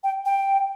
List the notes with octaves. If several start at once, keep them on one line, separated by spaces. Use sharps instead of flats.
G5
G5